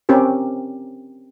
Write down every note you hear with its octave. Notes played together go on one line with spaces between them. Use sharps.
C4 C#4 G4 A#4